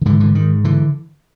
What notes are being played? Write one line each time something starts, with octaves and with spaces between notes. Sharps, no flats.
D#3
G#2 D3 E3
D3 E3
G#2 D#3
D3 E3